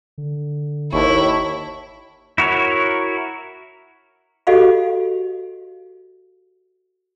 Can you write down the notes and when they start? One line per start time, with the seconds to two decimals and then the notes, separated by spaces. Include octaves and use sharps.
0.18 D3
0.92 G#1 D#2 E4 A4 C#5
2.38 E4 F#4 A#4 C#5
4.47 F#4 G4 A4 D#5 F5 B5